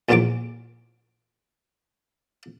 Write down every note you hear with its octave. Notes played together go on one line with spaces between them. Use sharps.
A#1 E2 A#2 F#3 C#6 D6